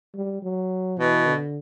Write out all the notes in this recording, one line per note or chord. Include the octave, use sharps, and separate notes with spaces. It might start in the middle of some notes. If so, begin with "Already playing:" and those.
G3
F#3
B2 E3
D3